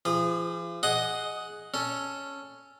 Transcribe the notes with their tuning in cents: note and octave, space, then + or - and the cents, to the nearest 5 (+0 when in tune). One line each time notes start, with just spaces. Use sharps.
F3 -40 G#4 -25
G#4 +10 D#5 +0 F#5 +0
C#4 +0 A4 +0